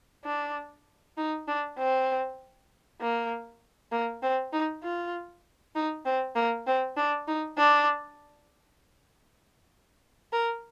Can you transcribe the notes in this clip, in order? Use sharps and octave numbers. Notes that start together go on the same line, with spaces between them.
D4
D#4
D4
C4
A#3
A#3
C4
D#4
F4
D#4
C4
A#3
C4
D4
D#4
D4
A#4